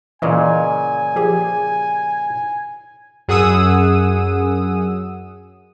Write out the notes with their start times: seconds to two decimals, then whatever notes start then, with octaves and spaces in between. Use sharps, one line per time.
0.22 A#2 C#3 E3 D#5 F5 G#5
1.16 F3 G4 G#4
3.28 F#2 G#4 F#5 D#6 E6 D#7